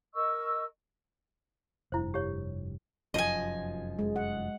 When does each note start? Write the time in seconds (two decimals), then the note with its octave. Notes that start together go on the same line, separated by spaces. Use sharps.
0.15 A#4 D#5 C#6 E6
1.92 F1 G2 E4 C5
2.14 G4 C#5
3.14 F1 F#2 F3 D#5 G#5
3.99 G#3
4.16 F#5